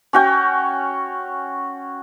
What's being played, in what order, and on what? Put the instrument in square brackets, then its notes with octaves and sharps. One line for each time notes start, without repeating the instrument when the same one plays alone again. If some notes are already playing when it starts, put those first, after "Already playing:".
[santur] C#4 F#4 G5